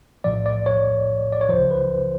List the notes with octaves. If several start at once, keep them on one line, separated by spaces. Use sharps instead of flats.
B1 A2 F3 D5
D5
C#5
D5
C#5
C#2 C#3 F3 C5
B4